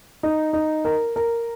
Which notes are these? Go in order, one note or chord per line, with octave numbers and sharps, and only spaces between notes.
D#4
D#4
A#4
A#4